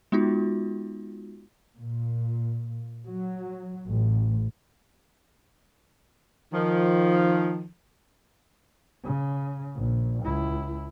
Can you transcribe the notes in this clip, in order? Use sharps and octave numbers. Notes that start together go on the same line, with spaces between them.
G#3 B3 D#4 F4 F#4
A#2
F#3
A1
D#3 F3
C#3
A#1
C#2 E4